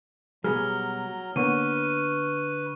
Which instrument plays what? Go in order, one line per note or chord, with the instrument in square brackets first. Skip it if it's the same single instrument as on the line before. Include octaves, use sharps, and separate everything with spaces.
[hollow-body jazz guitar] B2 G3 [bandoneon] F#3 A#5 [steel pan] G#4 [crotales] F6
[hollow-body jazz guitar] D3 [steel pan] A#3 B3 C#5 [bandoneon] B4 [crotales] C#6 D#7